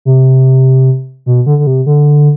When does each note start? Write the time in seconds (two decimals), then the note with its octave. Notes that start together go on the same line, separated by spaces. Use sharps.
0.05 C3
1.26 B2
1.46 D3
1.59 D3
1.67 C3
1.86 D3